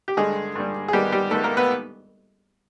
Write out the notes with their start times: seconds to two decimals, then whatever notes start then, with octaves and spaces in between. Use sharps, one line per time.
0.08 G4
0.17 G2 D3 G3 G#3 G#4
0.55 G2 D3 G3
0.88 G#4
0.93 G#2 D#3 G3 G#3 B3 G4
1.12 G3 G4
1.31 G#2 D#3 G#3 A3 B3 A4
1.44 A#3 A#4
1.57 B3 B4